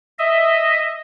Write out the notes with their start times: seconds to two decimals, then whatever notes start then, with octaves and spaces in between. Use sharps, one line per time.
0.19 D#5 E5